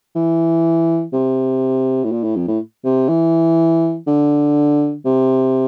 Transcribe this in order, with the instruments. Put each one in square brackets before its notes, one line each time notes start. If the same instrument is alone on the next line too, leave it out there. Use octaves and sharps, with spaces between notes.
[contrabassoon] E3
C3
A2
A#2
A2
F2
A2
C3
E3
D3
C3